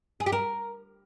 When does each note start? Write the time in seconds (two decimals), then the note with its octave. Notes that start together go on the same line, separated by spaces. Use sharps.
0.20 G#4
0.26 G4
0.32 A#4